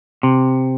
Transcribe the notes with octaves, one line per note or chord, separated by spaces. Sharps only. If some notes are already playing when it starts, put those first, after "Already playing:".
C3